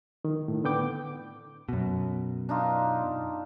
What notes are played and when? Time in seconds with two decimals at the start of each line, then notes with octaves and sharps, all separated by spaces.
0.25 D#3
0.48 A2
0.64 D3 B3 G5 D6
1.69 F#2 B2
2.49 D4 D#4 F4